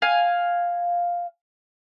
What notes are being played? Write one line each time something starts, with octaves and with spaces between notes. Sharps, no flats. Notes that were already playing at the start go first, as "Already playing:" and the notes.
F5 G#5